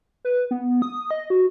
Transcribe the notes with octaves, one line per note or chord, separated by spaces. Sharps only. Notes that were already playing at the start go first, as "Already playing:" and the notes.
B4
B3
D#6
D#5
F#4